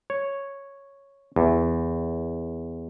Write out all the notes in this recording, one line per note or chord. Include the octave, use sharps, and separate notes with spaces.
C#5
E2